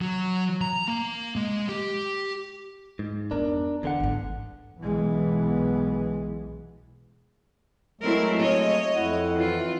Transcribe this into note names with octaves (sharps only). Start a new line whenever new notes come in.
F#3
A#5
A#3
G#3
G4
G#2
F2 B3 D4 A#4
E2 D3 E3 F#5
G#1 G2
B1 B2 E3 G#3 B3
F#3 G#3 A3 C4 E4 A#4
C#5 D#5
F2 E4 F#5
E3 F4